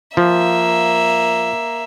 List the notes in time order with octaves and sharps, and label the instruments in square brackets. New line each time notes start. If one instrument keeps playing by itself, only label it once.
[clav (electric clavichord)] F3 [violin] A#3 E5